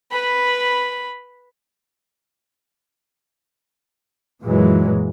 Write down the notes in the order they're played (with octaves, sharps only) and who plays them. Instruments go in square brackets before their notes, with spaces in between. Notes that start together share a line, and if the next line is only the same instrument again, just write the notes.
[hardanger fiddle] B4 B5
[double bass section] F#2 A#2 E3 F#3 G#3